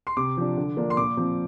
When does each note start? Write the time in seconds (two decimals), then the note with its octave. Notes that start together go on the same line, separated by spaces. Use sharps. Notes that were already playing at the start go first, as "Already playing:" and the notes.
0.07 C6
0.17 C3 D6
0.37 F3 D4
0.57 D3
0.77 F3 A#3 D4
0.90 C6
0.97 A#2 D6
1.17 F3 C4